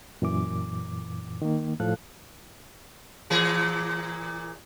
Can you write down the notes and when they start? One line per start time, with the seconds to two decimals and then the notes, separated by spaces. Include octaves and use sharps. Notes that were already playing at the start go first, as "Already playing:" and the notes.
0.22 F#2 A#2 E3 D6
1.42 D#3 A#3
1.80 A2 F3 A4 F5 F#6
3.30 A#2 E3 G#4